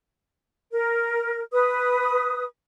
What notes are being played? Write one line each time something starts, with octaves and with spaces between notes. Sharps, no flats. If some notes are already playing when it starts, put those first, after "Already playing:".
A#4
B4 D#6